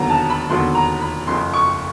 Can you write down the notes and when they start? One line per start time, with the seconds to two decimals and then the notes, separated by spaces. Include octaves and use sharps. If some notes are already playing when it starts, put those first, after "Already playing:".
Already playing: E1 D#2 D3 F#3 B3 A#5
0.10 A5
0.30 B5
0.49 E1 D#2 D3 F#3 B3 C6
0.75 A#5
1.01 B5
1.27 F#1 F2 C#3 C6
1.54 C#6